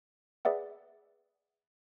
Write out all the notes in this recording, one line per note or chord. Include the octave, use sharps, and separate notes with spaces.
G#4 B4 D5 E5 F#5